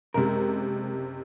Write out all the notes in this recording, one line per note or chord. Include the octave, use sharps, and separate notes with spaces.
F#1 C3 G#3 A#4